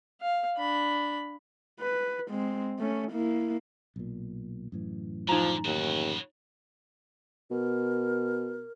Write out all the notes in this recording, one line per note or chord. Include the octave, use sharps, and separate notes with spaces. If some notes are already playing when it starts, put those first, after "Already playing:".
F5
D4 B5
B4
G#3 C4
A3 C#4
A#3 E4
B1 A#2
F#2 A2 E3
D3 F3 D#4 A#5
D#2 C#3 F#4
B2 A#4